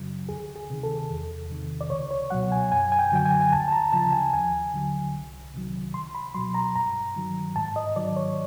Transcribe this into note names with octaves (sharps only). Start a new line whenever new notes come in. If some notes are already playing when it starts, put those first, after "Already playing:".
Already playing: F#2 C#3 F#3
D2 G#4
G#4
C3 D#3
A4
E2
C3 D#3
D5
C#2 C#5
C#5
B2 F#3 F#5
G#5
F#2 G#5
G#5
G5
D3 F#3 G5
G#5
G#5
D2 A5
A5
A#5
C#3 F3 A5
G#5
D#2 G#5
D3 F#3
C2
C3 D#3 F#3
C#2 C6
B5
B2 F#3 C6
A#5
G2 A#5
D#3 F#3
G#2 A5
D#5
D#3 F#3 D5
C#5